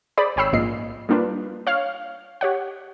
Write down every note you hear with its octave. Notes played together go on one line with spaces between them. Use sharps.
G#4 C5 D5 B5 D#6
G#1 C#5 G5 B5 E6 C7
A#1 G#2 A#3 F4 D#5 C7
G3 A#3 D4 F4 B4
C#5 F5 F6
G4 C#5 F#5